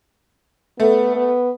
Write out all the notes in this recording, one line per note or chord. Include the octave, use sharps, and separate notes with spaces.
A3 B3
B3